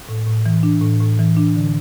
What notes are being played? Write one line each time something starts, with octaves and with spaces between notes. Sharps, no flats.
A2
A2
E3
D4
A2
A2
E3
D4
D3